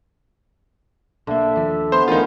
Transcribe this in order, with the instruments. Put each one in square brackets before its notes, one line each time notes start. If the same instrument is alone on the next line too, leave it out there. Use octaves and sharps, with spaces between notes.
[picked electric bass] B1 A#3 [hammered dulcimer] D3 [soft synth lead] E5
[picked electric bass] D#2 F3
[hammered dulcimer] B3 [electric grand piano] C5 C6
[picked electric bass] D2 E3 [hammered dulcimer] C#3 [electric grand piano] D#4 F4 [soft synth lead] A#4